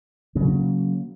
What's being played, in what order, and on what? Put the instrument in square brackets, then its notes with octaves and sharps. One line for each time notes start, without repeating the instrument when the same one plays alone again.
[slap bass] C#3 F#3 A#3